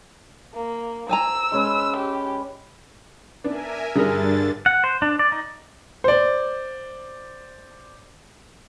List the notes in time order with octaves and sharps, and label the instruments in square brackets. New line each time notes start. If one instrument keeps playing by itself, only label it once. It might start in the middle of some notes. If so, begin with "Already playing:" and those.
[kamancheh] A#3
[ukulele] C5 G#5 A#5 [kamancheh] E6
[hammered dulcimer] G#3 C#4 B4
[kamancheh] G4
[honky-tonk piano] B3 D4 [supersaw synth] A#4 E5 G#5
[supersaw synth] G2 D4 A6 [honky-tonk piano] D3 G3 [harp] G#4 A#4
[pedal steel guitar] F#5
C5
D4
D5
D#4
[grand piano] C5 D5